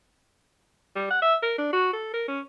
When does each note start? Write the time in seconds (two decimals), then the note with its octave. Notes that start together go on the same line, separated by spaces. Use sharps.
0.96 G3
1.10 F#5
1.22 E5
1.43 A#4
1.58 D4
1.73 F#4
1.93 A4
2.14 A#4
2.28 C#4